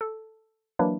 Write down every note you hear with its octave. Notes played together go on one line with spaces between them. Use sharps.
A4
E3 F#3 A#3 D4 E4